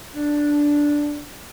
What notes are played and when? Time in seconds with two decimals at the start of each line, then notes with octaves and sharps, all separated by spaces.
0.14 D4